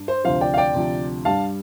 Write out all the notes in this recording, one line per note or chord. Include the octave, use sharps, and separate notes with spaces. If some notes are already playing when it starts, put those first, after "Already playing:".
Already playing: G2
C5
D2 C3 F3 C5 F5
D5 G5
F5
D5 G5
D2 C3 F3
G2 G3 F5 A5